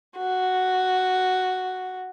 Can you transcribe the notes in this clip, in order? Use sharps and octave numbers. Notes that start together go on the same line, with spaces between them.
F#4